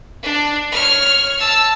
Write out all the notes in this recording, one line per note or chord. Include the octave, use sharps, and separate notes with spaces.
D4
C#5 F6
A5 E6